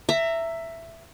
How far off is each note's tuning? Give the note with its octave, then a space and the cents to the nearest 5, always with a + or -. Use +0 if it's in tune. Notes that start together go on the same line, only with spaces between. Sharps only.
E5 +10 A#5 -20